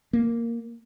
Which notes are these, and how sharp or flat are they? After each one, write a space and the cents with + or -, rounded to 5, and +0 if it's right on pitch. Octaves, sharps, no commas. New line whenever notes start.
A#3 -5